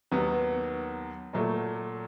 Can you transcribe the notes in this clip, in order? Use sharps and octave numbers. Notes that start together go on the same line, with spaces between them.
D#2 D#3 F#3 B3
A#2 F#3 A3